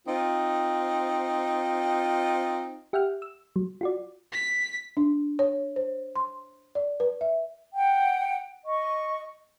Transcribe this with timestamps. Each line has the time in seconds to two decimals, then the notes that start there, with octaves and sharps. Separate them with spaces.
0.07 C4 D#4 F4
2.93 G4 E5 F#5 G5 F6
3.22 E6
3.56 F#3
3.81 F4 F#4 D5
4.32 B6
4.97 D4
5.39 C#5
5.76 C5
6.16 C6
6.75 D5
7.00 B4
7.21 E5
7.75 F#5 G5
8.65 D#5 C#6